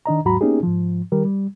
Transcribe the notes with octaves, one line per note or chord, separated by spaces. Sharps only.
D#3 D4 D#5 A#5
D#2 G#2 F#3 F#4 A#5 B5
A#3 B3 C#4 D#4 G4 G#4
G#2 F3
D#3 G3 G4 A#4
G3